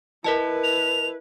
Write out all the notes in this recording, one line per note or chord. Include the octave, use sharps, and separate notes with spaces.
E4 A#4 B4 D#5 A5
F7